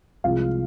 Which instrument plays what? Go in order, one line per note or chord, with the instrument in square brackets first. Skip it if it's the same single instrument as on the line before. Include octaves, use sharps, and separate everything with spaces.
[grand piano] C2 C3 F3 G#3 F4 F5